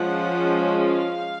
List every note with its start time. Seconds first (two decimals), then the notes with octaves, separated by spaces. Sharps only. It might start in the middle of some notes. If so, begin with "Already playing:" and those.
Already playing: F3 G#3 C#4 F#5
0.84 F5